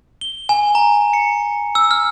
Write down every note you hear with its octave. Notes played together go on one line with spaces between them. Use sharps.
G7
G#5
A#5
C#7
E6
F6